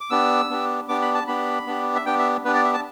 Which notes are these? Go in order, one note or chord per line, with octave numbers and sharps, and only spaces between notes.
D6
B3 D4 G4 E6
B3 D4 G4
B3 D4 G4 D6
B5
A5
B3 D4 G4 B5
B3 D4 G4
E5
B3 D4 G4 G5
E5
B3 D4 G4 B4
D5
E5
A5